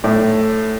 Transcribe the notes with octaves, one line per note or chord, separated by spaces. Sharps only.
A2